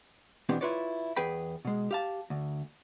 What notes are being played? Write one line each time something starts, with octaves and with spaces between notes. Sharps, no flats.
B2 E3 B3 C4 D4 G4
E4 F4 B4 C#5 D5
E2 G#4 B4 G5 B5
B2 G#3
G4 F5 A5
D2